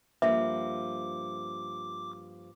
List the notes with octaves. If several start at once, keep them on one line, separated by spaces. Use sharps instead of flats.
G2 F3 A#3 E5 D6